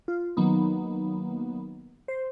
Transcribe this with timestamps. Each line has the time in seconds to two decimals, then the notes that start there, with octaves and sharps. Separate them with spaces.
0.08 F4
0.37 D#3 F#3 A#3 B3 D#4
2.08 C5